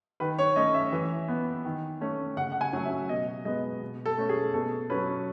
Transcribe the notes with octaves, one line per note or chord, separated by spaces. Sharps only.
D#3 B4
C#5
A3 C#4 D#5
E5
E3
B3
D#3
A3 C#4
C#3 F#5
F#5
G#5
F#3 A3 C#4
E5
B2 D#5
G#3 B3 D#5
B2
A4
A3 C#4
G#4
B2 A4
F#3 C#4 B4